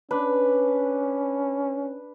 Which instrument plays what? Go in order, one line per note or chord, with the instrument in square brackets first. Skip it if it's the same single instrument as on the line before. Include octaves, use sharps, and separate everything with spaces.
[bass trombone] C#4 [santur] D4 B4